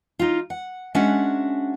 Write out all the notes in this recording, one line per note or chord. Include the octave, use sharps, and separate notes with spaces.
D#4 F4
F#5
G#3 C#4 D4 F#4 E5 F#5